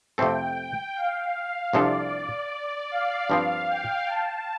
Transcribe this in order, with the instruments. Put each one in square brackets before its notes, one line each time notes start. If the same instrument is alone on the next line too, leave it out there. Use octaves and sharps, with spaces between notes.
[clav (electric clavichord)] F2 C3 A3 C4 A4 [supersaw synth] G5
[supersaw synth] F5
[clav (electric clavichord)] C2 C3 F3 D4 A4 [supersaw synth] D5
[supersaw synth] D5
F5
[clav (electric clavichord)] G2 F3 C4
[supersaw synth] G5
A5